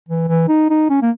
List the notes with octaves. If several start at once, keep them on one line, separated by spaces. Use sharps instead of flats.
E3
E3
D#4
D#4
C#4
A#3